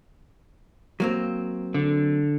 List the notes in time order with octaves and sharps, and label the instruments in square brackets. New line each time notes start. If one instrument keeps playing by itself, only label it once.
[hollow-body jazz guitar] F#3 A#3 C4
[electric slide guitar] D3